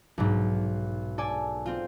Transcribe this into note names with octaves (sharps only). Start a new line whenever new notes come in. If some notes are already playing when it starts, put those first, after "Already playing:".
B1 G#2
A4 D5 G#5
C4 F4